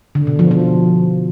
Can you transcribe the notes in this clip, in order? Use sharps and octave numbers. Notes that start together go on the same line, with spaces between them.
D3
B2
F3
F3